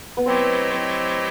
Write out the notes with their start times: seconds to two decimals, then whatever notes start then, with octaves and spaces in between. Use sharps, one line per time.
0.17 B3
0.26 F#3 A3 C4 E4 G4 D#5
0.71 C4